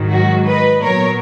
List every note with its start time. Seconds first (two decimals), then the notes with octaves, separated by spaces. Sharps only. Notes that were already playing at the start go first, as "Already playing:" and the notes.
Already playing: G#2 D#3 F#3
0.11 F#4
0.46 B4 D#5
0.80 A#2 F#3 B3 A#4 C#5